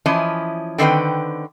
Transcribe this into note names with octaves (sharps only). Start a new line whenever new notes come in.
E3 F3 C#4 E4 D#5
D3 D#3 C4 B4 G5